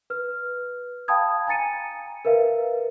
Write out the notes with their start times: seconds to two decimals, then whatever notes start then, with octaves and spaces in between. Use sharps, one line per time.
0.10 B4 F6
1.08 F5 G5 A5 B5 D#6 G#6
1.47 G#5 A#5 A6 C#7 D#7
2.25 A#4 B4 E5 F5